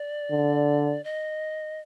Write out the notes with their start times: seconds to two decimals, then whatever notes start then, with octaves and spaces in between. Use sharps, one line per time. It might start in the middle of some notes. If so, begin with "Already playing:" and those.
Already playing: D5
0.31 D3
1.04 D#5